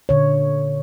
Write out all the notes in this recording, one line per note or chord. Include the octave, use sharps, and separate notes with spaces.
A#2 D3 C#5